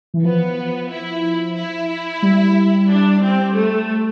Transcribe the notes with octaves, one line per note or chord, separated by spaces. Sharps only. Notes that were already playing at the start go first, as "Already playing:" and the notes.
E3
F3 B3
E4
E4
G3
D4
C4
A3